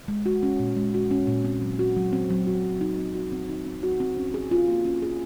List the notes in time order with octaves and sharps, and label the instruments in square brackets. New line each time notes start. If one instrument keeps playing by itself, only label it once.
[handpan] G#3
F#4
C#4
A#2
G#3
F#4
C#4
A#2
C4
F#3
F#4
F#3
C4
F#3
F#4
F#3
D#4
C4
F#4
C4
D#4
C4
F#4
C4
C#4
G#4
F4
A#3
C#4
G#4